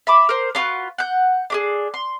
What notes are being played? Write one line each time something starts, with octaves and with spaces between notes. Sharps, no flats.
E5 B5 D6
A#4 C5
D4 F4 F#4 B4
F#5 G6
D4 G4 G#4
C6